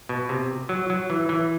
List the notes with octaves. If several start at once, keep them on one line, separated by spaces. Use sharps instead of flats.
B2
C3
F#3
F#3
E3
E3